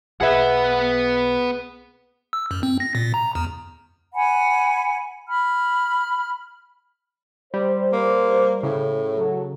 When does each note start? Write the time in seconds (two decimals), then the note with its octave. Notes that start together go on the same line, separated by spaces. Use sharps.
0.21 B1 B3 G#4 B4 E5 F#5
2.33 E6
2.51 F#2
2.63 C4
2.80 A#6
2.95 A#2
3.14 A#5
3.35 E2
4.14 F#5 G#5 B5
5.28 B5 F6
7.54 G3 C5
7.93 A#3
8.63 A2 C#3
9.17 F#3 A4